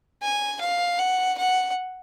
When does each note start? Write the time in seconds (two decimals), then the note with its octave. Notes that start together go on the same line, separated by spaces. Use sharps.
0.22 G#5
0.61 F5
0.99 F#5
1.38 F#5